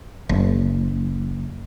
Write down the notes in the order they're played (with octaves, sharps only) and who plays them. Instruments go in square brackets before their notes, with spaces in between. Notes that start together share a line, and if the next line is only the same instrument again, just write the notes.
[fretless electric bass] F#1